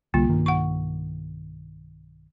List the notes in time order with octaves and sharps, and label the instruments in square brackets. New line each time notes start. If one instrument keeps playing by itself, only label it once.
[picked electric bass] C2 D3 G3 [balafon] A#3 F4
[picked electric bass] B1 G2 D#3
[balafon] F#5 C#6